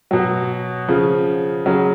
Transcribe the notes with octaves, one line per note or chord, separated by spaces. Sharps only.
B2 F#3
C#3 F3
C#3 F#3